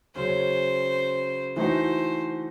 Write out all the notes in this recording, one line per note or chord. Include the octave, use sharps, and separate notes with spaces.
C#3 F#3 C#4 C5
E3 A3 D#4 F#4 C5